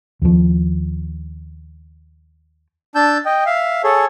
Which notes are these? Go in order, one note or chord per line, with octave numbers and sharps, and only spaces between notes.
D#2 F3
D4 A5 E6 G6
D#5 G5
E5 F5
G#4 A4 C#5